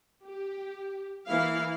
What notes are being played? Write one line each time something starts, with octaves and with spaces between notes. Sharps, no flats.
G4
E3 A#3 E4 F5